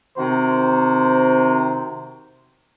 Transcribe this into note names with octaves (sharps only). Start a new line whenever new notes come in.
C3 D#3 F#4 C5 A#5